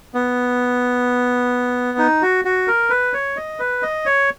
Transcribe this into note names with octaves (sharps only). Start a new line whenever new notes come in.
B3
D#4
F#4
F#4
A#4
B4
C#5
D#5
B4
D#5
C#5